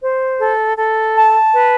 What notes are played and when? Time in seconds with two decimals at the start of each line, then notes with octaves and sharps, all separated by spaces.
0.03 C5
0.40 A4
0.78 A4
1.17 A5
1.54 B4